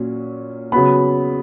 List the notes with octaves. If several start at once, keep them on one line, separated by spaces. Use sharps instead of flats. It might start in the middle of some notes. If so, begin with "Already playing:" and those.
Already playing: A#2 F#3 C#4
C#3 F#3 B3 B5